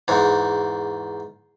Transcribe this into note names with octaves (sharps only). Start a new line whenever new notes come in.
E2 G#2